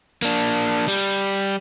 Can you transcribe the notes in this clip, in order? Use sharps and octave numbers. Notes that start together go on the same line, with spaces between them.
A#3 D4
G3